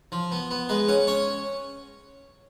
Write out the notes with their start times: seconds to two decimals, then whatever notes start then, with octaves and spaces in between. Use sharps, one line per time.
0.12 F3
0.32 B3
0.51 B3
0.69 G#3 B4
0.88 C#4 F#5
1.07 C#4 C#5